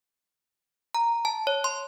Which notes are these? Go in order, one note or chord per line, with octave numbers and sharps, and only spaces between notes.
A#5
A5
C#5
C6